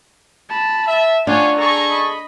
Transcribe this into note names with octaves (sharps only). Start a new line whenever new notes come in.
A5 B5
E5
C#4 D4 F4 C#5 F#5 G#5
G#4 A4 A#5 C#6
D#5 B5